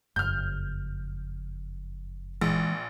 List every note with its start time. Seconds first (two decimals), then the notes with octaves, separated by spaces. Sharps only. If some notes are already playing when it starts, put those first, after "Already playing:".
0.16 F#1 F2 F6 G6
2.41 A#1 E3 G#3